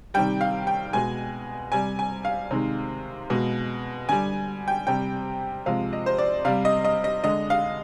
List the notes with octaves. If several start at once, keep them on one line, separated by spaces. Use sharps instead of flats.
C3 D#3 G3 G5
F5
G5
B2 G#3 G#5
C3 G3 G#5
G#5
F5
C3 D#3 G#3
B2 G#3
D3 G3 G#5
G5
C3 G3 G5
C3 F3 G#3 F5
D#5
C5
D5
C3 G3 F5
D#5
D#5
D#5
D3 G#3 D#5
F5